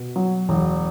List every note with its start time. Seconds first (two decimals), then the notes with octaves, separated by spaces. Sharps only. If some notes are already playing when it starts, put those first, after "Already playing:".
Already playing: B2
0.16 F#3
0.49 E1